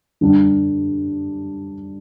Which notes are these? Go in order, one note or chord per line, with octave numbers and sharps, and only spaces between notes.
D3 G3 D4